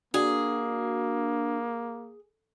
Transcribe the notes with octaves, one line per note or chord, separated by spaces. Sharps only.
A#3 D4 F#4 G#4